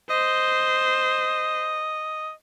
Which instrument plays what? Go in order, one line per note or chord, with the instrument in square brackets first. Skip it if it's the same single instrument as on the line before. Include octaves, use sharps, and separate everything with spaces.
[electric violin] C5 [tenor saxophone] D#5